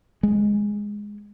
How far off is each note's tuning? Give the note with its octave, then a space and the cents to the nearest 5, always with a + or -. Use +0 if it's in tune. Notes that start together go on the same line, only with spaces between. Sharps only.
G#3 -5